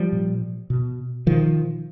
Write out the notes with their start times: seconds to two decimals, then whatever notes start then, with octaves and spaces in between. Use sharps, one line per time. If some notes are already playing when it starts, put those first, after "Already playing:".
Already playing: F3 G3
0.13 A#2
0.70 B2
1.26 B2 D#3 F3